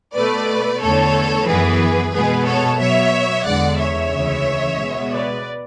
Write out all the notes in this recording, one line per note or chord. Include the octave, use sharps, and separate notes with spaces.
B2 A3 B4 D5
E2 D3 A3 A4 C#5
F#2 E3 B3 G#4 B4
B2 G#3 B3 G#4 B4
A4 C#5
B2 F#3 B3 C#5 E5
E2 D3 G#3 D5 F#5
C#5 E5
D2 C#3 E3 G#3
B2 G#3 B3
B4 D5